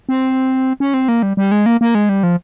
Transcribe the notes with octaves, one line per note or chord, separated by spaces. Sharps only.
C4
C#4
C4
A#3
G3
G3
G#3
A#3
A#3
G#3
G3
F3